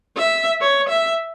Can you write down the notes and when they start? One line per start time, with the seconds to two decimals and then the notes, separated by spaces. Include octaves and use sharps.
0.17 E5
0.61 C#5
0.89 E5